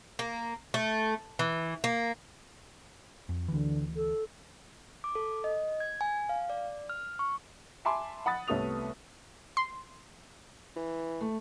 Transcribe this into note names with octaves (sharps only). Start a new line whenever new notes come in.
A#3
A3
E3
A#3
F2
D2 D3 E3
A4
D6
A4
D#5
G#6
G#5
F5
D5
F6
C#6
E5 G#5 A5 B5 C6 D6
F#5 B5 D#6 A6
C2 A3 B3 C#5 D#6 F7
C6
E3
A3